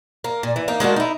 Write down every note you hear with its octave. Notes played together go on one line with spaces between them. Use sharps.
A#3
A#2
E3
A#3 D#4
G#3 A#3 D4 F#4
D#4 E4